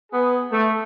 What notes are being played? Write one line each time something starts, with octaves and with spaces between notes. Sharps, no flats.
B3 G#4
A3